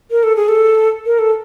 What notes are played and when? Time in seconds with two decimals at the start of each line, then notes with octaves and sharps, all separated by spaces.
0.11 A#4
0.23 A4
0.36 G#4
0.48 A4
1.06 A#4
1.19 A4